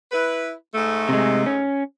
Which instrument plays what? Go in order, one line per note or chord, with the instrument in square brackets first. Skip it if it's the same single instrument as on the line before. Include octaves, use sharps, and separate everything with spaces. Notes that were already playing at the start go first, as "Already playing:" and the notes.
[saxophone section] E4 B4
G#2 A3
[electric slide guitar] C3 G#3
C#4